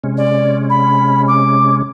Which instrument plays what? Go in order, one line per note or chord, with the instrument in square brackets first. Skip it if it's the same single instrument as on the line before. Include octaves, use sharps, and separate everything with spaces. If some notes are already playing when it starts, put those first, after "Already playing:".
[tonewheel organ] C3 G#3 C#4
[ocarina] D5
B5
D6